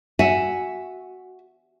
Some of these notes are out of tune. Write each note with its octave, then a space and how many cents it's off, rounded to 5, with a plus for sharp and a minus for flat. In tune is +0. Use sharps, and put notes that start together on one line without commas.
F#4 +0 E5 +0 G#5 +0